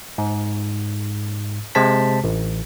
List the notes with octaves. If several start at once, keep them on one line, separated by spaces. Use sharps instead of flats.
G#2
C3 G#3 C5 A5 B6
A1